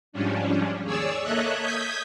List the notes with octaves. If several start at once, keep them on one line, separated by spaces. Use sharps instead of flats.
G#2 F3 G3 C#4 D4
D#2 G#4 C#5 D5 E6
A#3 A4 C#5 D#5 E5 F#6
D#6 G6 G#6 B6